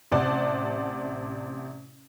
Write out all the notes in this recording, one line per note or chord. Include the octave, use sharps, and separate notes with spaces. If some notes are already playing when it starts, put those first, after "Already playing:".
A1 C3 C5 D5 F#5 A5